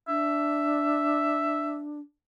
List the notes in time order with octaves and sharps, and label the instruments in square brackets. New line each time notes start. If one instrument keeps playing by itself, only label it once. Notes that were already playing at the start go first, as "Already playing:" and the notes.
[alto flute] D4 [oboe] E5